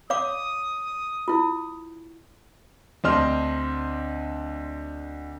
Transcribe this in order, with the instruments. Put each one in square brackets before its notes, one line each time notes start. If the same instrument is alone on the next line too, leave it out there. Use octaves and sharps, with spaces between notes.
[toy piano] C#5 F5 D6 [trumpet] D#6
[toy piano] E4 F4
[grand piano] D2 C4 D4 D#5 C6 F6